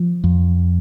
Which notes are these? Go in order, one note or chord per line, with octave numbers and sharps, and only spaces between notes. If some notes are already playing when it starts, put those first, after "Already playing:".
Already playing: F3
F2